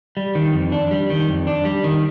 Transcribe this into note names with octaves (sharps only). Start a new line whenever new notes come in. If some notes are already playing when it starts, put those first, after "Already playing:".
G3
D#3
F2
D4
G3
D#3
F2
D4
G3
D#3